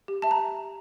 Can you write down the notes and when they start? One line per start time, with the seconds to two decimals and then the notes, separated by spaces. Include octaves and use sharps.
0.08 G4
0.22 E5 A5
0.31 A#5